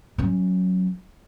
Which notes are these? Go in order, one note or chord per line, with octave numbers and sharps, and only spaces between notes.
F#3 C#4